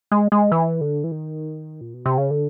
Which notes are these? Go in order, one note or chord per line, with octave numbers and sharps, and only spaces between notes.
G#3
G#3
E3
D3
E3
D#3
A#2
B2
C3
C#3
D3